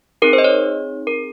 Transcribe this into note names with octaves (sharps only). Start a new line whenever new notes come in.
C4 D#4 G#4 A#4
C5
D#5
C#5
A#4